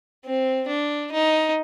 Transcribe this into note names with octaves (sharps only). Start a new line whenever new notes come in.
C4
D4
D#4